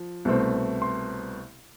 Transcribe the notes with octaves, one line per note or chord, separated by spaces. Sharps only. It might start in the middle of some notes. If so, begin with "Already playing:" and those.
Already playing: F3
C2 B2 A3 C4
C6